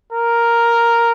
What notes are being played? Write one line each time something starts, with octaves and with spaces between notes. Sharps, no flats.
A#4